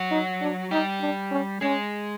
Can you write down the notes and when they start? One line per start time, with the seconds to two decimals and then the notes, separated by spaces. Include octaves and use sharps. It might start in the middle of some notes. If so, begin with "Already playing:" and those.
Already playing: F#3 F#4
0.11 D#4
0.41 D4
0.71 G3 D#4 G4
1.01 D4
1.31 C#4
1.61 G#3 C#4 G#4